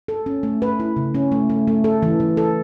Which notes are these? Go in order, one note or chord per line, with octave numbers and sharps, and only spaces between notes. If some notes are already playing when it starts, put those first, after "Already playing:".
A4
C#4
A3
B4
E4
C#3
C#4
A3
A3
A3
A4
E3
E3
A4